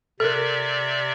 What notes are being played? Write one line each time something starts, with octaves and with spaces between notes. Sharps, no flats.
C3 A4 A#4 D5 E5